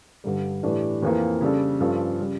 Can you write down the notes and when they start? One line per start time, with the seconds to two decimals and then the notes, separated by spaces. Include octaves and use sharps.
0.24 G2 D3 G3
0.63 A2 E3 A3 D4 G4
1.02 F2 E3 A#3
1.41 C#3 G3 D4 A4
1.80 G2 F3 C#4 F4 A4
2.19 C#3 G3